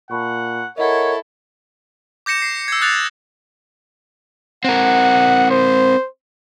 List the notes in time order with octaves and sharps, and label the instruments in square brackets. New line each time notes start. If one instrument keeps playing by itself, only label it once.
[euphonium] A#2 [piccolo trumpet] F#5 [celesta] A5 B5 C#6
[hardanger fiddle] E4 A4 [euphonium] A#4 [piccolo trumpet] C#5 [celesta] D#5 F#5
[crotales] D6 G6 A#6 C#7 E7
C7
E6 G#6
D#6 F#6 A6 F7
[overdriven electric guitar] C4 A#4 [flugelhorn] F#5
[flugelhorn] C5